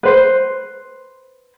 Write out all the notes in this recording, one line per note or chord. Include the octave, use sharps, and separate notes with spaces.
B4 C5